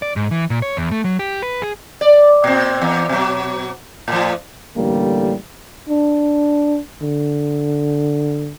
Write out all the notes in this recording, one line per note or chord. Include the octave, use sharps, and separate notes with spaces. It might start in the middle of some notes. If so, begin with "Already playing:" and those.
D5
G#2
E3
A#2
C#5
E2
A3
F#3
G4
B4
G#4
D5
A#2 C4
E2
B2 F#3
A2 F3
A1 D3 G3 A#3
D4
D3